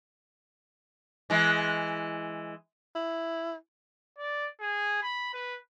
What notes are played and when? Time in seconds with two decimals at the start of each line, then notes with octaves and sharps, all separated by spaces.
1.30 E3 G#3
2.95 E4
4.18 D5
4.60 G#4
5.03 B5
5.34 B4